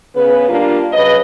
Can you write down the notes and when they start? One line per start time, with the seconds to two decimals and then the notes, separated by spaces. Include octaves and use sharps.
0.15 C#3 B3 B4
0.49 G3 A#3 D4 F4
0.92 C#3 F#3 B4 D#5